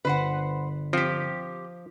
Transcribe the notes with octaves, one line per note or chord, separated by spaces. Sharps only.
G1 B4 C5 F#5
F3 C4 G4